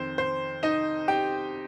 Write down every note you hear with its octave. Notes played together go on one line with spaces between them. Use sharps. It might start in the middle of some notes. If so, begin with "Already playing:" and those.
Already playing: F2 D#3 C4 C5
C5
D#4 D#5
G4 G5